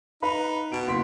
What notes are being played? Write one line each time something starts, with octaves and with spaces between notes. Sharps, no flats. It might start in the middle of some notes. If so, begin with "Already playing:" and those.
D#4 B4 F5 B5
B2 D7
F#1 C6 B6